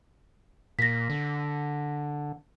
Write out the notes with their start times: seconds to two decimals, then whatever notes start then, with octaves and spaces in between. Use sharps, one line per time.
0.79 A#2 A#6 B6
1.10 D3